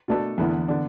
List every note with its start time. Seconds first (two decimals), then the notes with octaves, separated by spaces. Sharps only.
0.08 B2 A3 D4 A4
0.38 E2 D3 B3 E4
0.68 D3 B3 D4